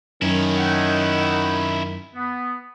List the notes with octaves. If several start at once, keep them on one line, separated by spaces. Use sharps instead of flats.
F#2 D#3 C#4 E4
D#5 F#5 G5
B3